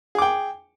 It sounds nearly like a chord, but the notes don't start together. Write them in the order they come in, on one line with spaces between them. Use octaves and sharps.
G#4 D6 G5